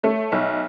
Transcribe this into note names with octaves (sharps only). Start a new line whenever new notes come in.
A3 C#5 E5
B1 C#5 E5